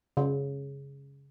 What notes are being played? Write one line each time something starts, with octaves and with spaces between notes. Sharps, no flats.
C#3